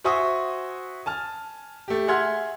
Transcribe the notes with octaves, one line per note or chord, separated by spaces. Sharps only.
F#4 C5 E5 G#5 C#6 D#6
G#5 A5 F6
A3 G4
G#4 E5 F#5 C6 F6 G#6